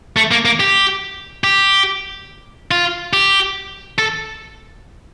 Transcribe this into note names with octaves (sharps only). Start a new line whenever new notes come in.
A3
A#3
A#3
G4
G4
F4
G4
A4